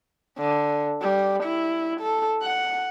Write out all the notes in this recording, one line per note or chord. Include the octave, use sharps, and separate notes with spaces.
D3
G3
E4
A4
F#5